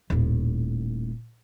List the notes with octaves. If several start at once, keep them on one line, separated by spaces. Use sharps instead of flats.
D#1 A2